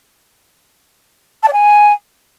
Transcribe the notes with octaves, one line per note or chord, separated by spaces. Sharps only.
A5
D5
G#5